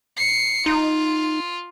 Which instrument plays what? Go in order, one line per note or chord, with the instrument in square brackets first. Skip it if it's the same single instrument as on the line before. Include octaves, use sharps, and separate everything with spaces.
[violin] C7 C#7
[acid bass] D#4 [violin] F4